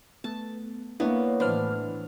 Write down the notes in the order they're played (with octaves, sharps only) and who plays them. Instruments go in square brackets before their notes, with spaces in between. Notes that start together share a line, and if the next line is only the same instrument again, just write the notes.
[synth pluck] A3 B3 [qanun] A5
[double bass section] A#3 [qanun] B3 [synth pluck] D4 E4 C#5
[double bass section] A2 E3 [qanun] D4 [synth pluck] B4 C5 F6